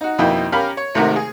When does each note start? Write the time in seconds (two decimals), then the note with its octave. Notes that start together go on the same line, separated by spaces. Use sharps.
0.01 D#4 F#4
0.18 F2 B2 D#3 A#3 E4 G5
0.52 C#4 G4 A#4 F5 B5
0.77 C#5
0.95 G#1 C3 D#3 A3 F#4 A#4
1.16 G#4